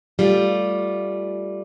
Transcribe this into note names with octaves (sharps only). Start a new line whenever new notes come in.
G3 A3 F4